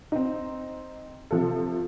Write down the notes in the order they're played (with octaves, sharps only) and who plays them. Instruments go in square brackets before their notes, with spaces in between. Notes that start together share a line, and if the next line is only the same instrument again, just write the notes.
[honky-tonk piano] C4 D#4
C3 F3 A4